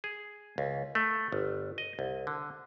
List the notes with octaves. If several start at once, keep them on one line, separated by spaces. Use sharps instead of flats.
G#4
C#2
A3
G1
D#5
C2
D3